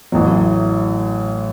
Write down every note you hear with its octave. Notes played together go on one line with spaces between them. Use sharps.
A1 A2 F#3